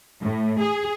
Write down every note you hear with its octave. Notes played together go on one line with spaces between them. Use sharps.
A2
G#4